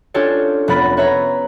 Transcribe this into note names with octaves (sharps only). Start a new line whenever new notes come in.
C#4 D4 F4 G4 A4 C#5
F1 B3 A#4 B5 A6 B6
B4 C#5 E5 A#5